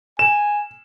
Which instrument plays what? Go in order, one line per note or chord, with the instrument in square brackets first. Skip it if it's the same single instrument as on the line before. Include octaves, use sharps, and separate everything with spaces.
[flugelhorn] G#5 [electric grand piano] E7